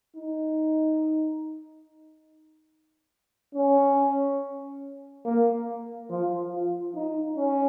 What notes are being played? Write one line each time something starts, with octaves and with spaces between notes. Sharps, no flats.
D#4
C#4
A#3
F3
F4
D#4
C#4